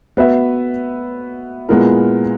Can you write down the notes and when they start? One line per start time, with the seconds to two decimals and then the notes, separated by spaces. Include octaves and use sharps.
0.17 B3 F#4 B4 E5
1.69 A#2 G#3 B3 E4 A#4